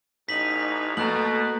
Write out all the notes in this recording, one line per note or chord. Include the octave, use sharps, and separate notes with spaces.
A1 D#4 B6 F#7
B2 A3 A#3 A#5 F#6 F#7